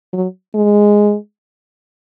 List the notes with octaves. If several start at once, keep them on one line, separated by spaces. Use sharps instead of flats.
F#3
G#3